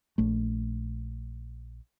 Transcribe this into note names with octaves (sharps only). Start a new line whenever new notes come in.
A#1 A3